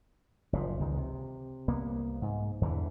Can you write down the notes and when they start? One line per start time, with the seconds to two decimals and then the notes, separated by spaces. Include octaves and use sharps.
0.53 F#1 A#2 C#3 F3
0.80 C#2 D#3 G#3
0.98 C3
1.68 C2 A#3 B3
2.22 G#2
2.61 E2 D3 E3